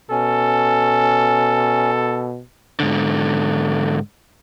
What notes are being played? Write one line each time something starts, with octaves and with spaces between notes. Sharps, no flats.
B2 C#4 A4
G#2 D3